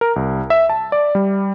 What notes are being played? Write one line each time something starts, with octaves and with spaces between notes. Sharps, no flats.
A#4
C2
E5
A5
D5
G3